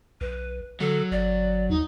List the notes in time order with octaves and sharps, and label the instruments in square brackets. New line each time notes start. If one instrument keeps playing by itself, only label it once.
[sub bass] B1 [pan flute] B4
[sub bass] D3 [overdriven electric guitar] F#3 [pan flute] A4
[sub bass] G1 [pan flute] D5
[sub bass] D#2 [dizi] D#4